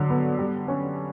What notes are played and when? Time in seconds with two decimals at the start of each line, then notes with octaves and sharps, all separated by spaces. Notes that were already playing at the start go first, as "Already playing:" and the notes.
Already playing: D3 F#3
0.10 B3
0.39 G3
0.68 C#4